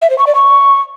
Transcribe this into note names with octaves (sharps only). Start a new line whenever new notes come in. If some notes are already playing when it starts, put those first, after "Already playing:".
E5
C5
C#6
D5
C#6